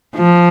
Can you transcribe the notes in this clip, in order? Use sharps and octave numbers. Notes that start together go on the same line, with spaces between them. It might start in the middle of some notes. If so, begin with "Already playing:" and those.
F3